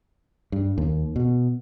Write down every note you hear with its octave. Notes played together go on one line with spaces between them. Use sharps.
G2
D#2
B2